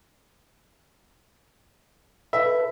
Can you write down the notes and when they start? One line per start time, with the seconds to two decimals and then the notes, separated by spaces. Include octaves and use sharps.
2.33 A4 B4 E5